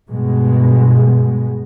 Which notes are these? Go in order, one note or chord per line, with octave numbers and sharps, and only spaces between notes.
G2 B2 G#3